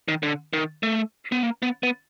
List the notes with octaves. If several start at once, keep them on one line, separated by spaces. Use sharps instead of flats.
D#3
D3
D#3
A3
B3
A#3
B3
B3